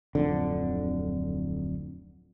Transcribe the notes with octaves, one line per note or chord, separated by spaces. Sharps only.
D1 F2 D3